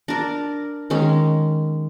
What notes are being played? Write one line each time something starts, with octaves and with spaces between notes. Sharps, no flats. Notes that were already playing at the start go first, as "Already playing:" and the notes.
D4 A#4
D#3 G#3 C#4